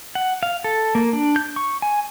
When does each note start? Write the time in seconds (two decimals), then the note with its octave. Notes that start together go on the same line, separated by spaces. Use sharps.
0.15 F#5
0.43 F5
0.64 A4
0.95 A#3
1.13 D4
1.36 G6
1.56 C#6
1.82 G#5